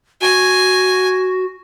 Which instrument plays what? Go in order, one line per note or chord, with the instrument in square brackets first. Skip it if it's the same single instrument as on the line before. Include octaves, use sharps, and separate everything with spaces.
[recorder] F#4 [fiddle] G#5